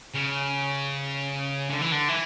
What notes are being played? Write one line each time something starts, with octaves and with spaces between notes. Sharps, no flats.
C#3
D3
E3
D3
E3